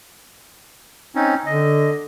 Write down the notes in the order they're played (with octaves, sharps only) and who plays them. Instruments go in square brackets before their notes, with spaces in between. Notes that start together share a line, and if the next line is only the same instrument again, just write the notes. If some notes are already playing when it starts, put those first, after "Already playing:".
[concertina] C4 C#4 D#4
[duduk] D3 [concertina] D#5